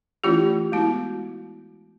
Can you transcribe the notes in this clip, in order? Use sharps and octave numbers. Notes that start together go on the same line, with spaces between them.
E3 A3 C#4 E4 F4 G4
G#3 B3 E4 F#4